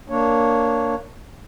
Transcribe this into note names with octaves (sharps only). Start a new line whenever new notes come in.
A#3 D4 C#5